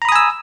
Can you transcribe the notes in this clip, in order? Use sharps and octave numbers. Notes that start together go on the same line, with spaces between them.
G#5 A#5 B5 D#6 E6